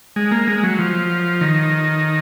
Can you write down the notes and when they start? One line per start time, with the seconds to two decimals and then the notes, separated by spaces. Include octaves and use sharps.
0.16 G#3
0.31 A#3
0.48 G#3
0.63 F#3
0.79 F3
1.41 D#3